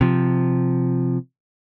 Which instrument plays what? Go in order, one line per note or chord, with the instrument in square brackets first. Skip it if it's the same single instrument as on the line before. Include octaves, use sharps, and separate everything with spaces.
[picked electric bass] C3 F3